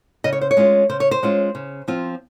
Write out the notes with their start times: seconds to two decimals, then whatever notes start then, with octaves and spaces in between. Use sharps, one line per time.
0.24 C#3 D#5
0.33 C#5
0.41 C5
0.51 C#5
0.57 G#3 C#4 F4
0.89 C#3 C5
1.00 C#5
1.11 C5
1.23 G#3 C#4 F4
1.55 C#3
1.88 F3 C4 F4